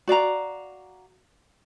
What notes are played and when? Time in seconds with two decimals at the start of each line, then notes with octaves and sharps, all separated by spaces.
0.08 F#4 D5 F5 A#5